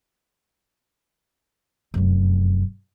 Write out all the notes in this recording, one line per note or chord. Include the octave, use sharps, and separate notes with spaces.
F1 F#2